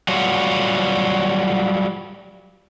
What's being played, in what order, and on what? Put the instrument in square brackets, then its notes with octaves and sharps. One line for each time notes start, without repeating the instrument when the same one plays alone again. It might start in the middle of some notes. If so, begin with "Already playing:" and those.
[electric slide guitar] F#3 G3 F4 F#4